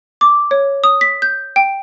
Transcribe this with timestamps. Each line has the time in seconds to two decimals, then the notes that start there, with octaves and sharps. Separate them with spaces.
0.21 D6
0.51 C#5
0.84 D#6
1.01 B6
1.22 G6
1.56 G5